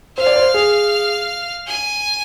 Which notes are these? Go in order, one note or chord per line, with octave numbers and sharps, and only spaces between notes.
C5 F5
D5
C5
G#4
G#5